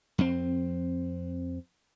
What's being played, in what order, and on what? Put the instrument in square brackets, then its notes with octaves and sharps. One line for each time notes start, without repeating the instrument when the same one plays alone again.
[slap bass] F2 C4